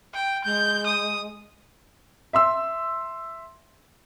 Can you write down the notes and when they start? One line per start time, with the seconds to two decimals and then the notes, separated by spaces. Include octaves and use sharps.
0.14 G5
0.45 G#3 G6
0.87 D#6
2.33 E5 C6 E6